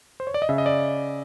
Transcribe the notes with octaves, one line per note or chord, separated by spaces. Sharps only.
C5
C#5
D5
D#5
C#3 E5
D#5
D5